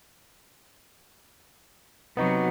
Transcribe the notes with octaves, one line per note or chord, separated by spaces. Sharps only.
C3 F#3 B3 D#4 F#4